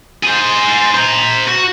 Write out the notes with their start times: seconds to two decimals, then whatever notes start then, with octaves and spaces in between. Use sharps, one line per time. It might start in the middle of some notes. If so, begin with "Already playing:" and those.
0.23 G#4 C5
0.95 C5 A#5
1.48 F#4